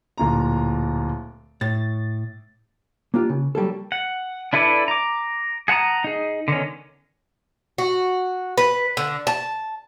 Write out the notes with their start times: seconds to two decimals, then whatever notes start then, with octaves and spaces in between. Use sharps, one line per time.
0.18 D1 A#2 A#5
1.61 A2 A6
3.14 A#3 D4 F4 G4
3.29 C#3
3.55 F#3 G3 A#3 A4
3.92 F#5
4.53 D4 E4 A4 B4 D5
4.88 A#5 D6
5.68 G#4 F#5 A5 A#5 D#6
6.04 D#4 G#4
6.48 D3 D#3 B3 C#4
7.78 F#4
8.57 B4
8.97 D3
9.27 A5